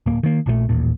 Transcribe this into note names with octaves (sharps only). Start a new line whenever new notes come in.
D1 A#3
D#3 A#3
A#1 A#2 F3 A3
A1 D#2 A#2